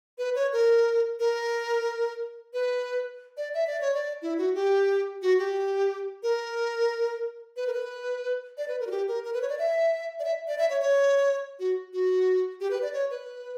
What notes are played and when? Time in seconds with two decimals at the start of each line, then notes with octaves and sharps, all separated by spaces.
0.18 B4
0.35 C#5
0.53 A#4
1.19 A#4
2.53 B4
3.37 D5
3.54 E5
3.67 D5
3.81 C#5
3.94 D5
4.22 E4
4.38 F#4
4.55 G4
5.22 F#4
5.39 G4
6.23 A#4
7.56 B4
7.67 A#4
7.73 B4
8.57 D5
8.68 B4
8.80 A#4
8.87 F#4
8.91 G4
9.08 A#4
9.24 A#4
9.34 B4
9.42 C#5
9.49 D5
9.59 E5
10.20 D5
10.25 E5
10.47 D5
10.58 E5
10.70 C#5
10.81 C#5
11.59 F#4
11.93 F#4
12.61 G4
12.71 B4
12.82 D5
12.93 C#5
13.11 B4